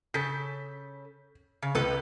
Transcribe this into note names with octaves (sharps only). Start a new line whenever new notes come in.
C#3 A4 G6 B6
C#3
C#2 A4 B4